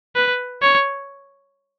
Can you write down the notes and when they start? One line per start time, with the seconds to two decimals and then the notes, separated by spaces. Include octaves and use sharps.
0.16 B4
0.62 C#5